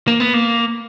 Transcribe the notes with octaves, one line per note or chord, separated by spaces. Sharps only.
A#3
B3
A#3